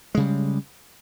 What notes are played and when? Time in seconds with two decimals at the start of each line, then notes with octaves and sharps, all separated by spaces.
0.15 G#3
0.17 C#3
0.20 G3